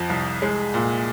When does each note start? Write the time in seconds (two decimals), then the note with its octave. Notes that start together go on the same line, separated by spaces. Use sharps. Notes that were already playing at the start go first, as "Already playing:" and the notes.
Already playing: F2 F3
0.10 C2
0.42 G#3
0.74 A#2